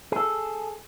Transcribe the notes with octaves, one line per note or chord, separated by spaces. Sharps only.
G#4 A4